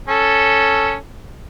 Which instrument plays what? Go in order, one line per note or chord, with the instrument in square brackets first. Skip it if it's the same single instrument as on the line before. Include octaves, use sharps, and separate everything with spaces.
[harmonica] C#4 A4